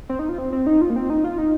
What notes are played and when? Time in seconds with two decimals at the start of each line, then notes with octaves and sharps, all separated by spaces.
0.09 C4
0.19 D#4
0.29 F4
0.38 C4
0.53 C4
0.67 D#4
0.81 F4
0.90 A#3
0.96 C4
1.10 D#4
1.24 F4
1.38 D#4